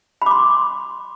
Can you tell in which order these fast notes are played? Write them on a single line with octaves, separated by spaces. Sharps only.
B5 D6 C6